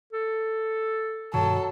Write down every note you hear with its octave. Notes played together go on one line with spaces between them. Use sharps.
A4
G2 B2 D#3 F#3 A4